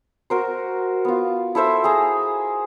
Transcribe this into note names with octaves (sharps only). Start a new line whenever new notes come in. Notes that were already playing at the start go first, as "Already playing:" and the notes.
F#4 A#4 C5
B3 F4
E4 A4 C5 E5
G#4 A#5